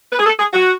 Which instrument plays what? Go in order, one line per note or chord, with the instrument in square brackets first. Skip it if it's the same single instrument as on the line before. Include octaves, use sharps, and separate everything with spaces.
[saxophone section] B4
G#4
A4
G#4
F#4